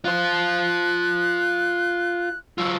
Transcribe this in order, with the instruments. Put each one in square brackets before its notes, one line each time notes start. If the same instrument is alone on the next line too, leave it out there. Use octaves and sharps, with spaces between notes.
[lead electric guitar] F4 C5 [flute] F#6
[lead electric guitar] F#3 F4 [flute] E6